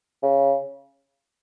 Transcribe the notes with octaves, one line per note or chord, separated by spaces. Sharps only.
C#3